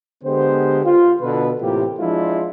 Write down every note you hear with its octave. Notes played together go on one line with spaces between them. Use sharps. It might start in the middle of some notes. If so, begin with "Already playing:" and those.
D3 G#3 B3 G4 C5
F4
B2 D3 B4
A2 C3 E3 A#3 F4 G4
F3 G#3 D4 E4 F4